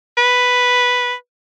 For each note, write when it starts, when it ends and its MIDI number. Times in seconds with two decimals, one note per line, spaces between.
0.17 1.14 71